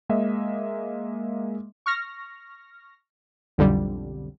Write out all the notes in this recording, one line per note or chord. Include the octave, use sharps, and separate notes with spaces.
G#3 A#3 D#5 E5
C#6 F6 A#6
B1 F2 D3 G3